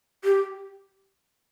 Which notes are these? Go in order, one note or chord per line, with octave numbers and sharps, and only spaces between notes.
G4